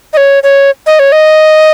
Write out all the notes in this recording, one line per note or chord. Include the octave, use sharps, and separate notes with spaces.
D#5
C#5
C#5
D#5
C#5
D#5